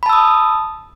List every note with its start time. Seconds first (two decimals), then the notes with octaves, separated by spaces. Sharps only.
0.03 B5
0.06 A5
0.09 E6
0.13 D#6